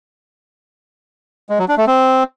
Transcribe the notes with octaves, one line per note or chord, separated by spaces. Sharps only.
G#3
F#3
D4
A3
C4